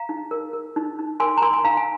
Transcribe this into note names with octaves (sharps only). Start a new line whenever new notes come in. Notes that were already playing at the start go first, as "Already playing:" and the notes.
Already playing: F5 A#5
D#4
A#4
A#4
D#4
D#4
A#4 G#5 C6
A#5
A#4 G#5 C6
G#5
D#4 F5 A#5
G#5